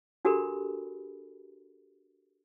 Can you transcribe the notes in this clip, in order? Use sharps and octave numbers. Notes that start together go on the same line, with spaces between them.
D4 F#4 G4 A4 A#4 B5